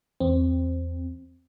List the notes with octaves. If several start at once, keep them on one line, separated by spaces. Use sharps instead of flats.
E2 C4